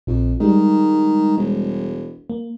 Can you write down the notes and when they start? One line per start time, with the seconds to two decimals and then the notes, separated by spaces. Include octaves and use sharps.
0.07 A#1 F2
0.40 D#3 G3 G#3
1.37 E1
2.30 A#3